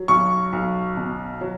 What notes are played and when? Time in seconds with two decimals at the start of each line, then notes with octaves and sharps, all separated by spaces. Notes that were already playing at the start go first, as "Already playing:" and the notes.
Already playing: F#3
0.08 B1 C#6
0.53 B1
0.97 B2
1.41 F#3